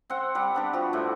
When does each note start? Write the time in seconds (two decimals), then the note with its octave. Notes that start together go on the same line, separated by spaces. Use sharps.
0.10 C4 F#5
0.35 G3 F#5
0.54 B3 D4 G4
0.73 F3 F#4
0.93 A2